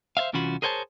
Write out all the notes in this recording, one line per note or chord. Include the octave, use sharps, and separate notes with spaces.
C5 D5 E5 F5
C2 E3 C#4 F4 F#4 B5
G#4 A#4 C5 C#5 G#5 A5